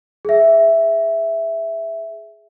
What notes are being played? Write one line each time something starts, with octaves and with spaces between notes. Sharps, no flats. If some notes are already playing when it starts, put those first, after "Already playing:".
G#4 E5